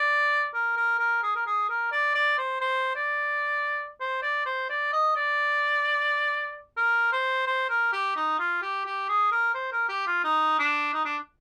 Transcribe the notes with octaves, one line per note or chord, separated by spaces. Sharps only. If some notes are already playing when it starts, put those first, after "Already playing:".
Already playing: D5
A#4
A#4
A#4
G#4
A#4
G#4
A#4
D5
D5
C5
C5
D5
C5
D5
C5
D5
D#5
D5
A#4
C5
C5
A#4
G4
D#4
F4
G4
G4
G#4
A#4
C5
A#4
G4
F4
D#4
D4
D#4
D4